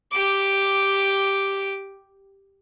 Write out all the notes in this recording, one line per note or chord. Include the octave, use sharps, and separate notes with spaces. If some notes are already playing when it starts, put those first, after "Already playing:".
G4 D6